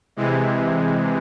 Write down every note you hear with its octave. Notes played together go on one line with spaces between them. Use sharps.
C3 E3 G#3